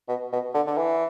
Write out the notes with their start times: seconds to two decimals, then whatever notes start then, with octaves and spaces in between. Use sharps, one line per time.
0.08 B2
0.32 B2
0.54 D3
0.67 D3
0.77 E3